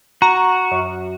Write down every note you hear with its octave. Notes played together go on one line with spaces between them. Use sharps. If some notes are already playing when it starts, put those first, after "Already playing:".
F#4 A#5
F#2